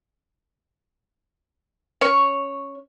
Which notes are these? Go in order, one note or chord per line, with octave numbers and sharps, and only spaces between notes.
C#4 C#5